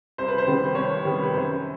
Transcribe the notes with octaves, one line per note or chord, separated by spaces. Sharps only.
C2 C5
B4
C5
C3 D#3 G3 B3
C5
C2 C#5
C3 D#3 G3 B3
B4
F#2 C5